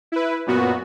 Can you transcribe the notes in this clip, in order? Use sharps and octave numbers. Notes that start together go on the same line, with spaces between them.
E4 B4
F#2 A#2 B3 F#4